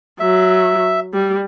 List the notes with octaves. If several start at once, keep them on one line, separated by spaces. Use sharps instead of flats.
F#3 E5
G3